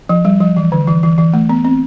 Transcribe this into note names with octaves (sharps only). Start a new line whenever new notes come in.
F3
G3
F3
E3
D3
E3
E3
E3
A3
B3
C4